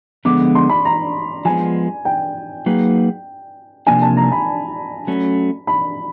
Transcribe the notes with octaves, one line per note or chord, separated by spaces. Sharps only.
D3 F3 G#3 B3 D6
C6
B5
A#5
F3 G#3 B3 G#5
G5
F#3 A#3 D#4 G#4 B4
C3 F3 A#3 D4 G#5
A5
A#5
B5
F#3 A3 C#4
B5